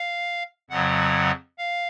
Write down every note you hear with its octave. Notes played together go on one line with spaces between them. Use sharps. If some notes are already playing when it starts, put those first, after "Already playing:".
Already playing: F5
F2 C#3 F#3 F#5
F5